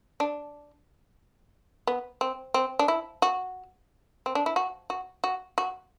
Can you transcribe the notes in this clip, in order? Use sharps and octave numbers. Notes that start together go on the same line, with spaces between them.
D4
B3
C4
C4
D4
E4
F#4
C4
D4
E4
F#4
F#4
F#4
F#4